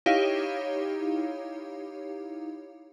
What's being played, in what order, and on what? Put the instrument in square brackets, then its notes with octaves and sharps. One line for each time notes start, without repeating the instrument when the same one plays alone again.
[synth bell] D#4 E4 G4 C#5 F5